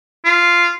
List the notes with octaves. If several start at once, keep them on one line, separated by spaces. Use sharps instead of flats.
F4